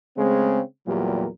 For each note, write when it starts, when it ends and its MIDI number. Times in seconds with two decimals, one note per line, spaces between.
0.17 0.60 49
0.17 0.60 56
0.17 0.60 57
0.17 0.60 60
0.87 1.27 40
0.87 1.27 46
0.87 1.27 54
0.87 1.27 55
0.87 1.27 67
0.87 1.27 70